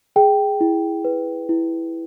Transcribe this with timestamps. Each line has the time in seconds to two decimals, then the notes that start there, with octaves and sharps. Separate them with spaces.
0.16 G#4 G5
0.61 E4
1.05 B4
1.49 E4